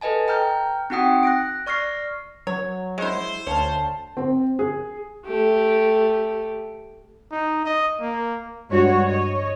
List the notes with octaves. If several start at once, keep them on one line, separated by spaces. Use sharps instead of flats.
A4 B4 D#5 G#5 A5
G5 A#5 F6 G6
C4 D#4 F#4 F#5 G5 D#6
F#6 A#6 D7
D5 C#6 F6 A#6 C7
F#3 C#5
G#3 E4 C5
D2 C#5 F5 A5
C4
G#4
A3 G4
D#4
D#5
A#3
G2 G#3 F#4 C#5
C#5 D#5